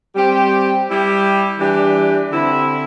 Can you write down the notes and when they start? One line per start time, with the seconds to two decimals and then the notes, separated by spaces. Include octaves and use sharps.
0.15 G3 C4 G4
0.88 G3 E4 G4
1.59 E3 G3 D4 G4
2.31 D3 C4 E4